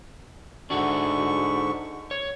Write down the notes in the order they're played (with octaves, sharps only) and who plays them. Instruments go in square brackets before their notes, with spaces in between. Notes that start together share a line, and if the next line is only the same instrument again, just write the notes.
[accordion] G#2 D3 C#6 [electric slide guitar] D4 F#4
[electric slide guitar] C#5